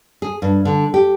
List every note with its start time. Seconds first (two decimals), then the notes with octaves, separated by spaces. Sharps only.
0.22 G#4
0.42 G2
0.65 D3
0.94 G4